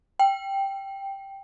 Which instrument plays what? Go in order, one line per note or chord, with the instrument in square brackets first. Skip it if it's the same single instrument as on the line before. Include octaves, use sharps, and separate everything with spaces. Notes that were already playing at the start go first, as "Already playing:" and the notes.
[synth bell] G5